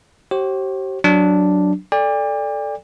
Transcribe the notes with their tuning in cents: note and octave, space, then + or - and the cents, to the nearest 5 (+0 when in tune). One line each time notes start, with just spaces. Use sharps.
G4 -35 C5 +40
F#3 +0 D4 +0
A4 +0 D5 +0 G5 +45